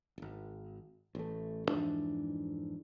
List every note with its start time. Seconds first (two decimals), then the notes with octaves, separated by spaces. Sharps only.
0.18 D#1 G#1
1.15 A1 A3
1.68 F2 G#2 E3 D4